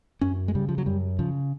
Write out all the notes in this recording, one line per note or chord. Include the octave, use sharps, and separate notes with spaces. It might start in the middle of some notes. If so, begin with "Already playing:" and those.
F#2 C#4
G#3
C#3 G3
F3
F#3
F#2 G3
C#3 F3